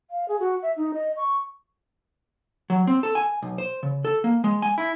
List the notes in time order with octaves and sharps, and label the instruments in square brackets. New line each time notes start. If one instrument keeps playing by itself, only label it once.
[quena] F5
G#4
F#4
E5
D#4
D#5
C#6
[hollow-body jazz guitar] F#3
C4
A4
G#5
B1
C5
C#3
A4
A#3
G#3
G#5
E4